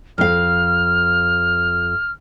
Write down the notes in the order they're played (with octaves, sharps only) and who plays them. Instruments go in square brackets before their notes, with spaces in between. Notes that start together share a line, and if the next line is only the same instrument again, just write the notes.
[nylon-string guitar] F2 F5 [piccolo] F6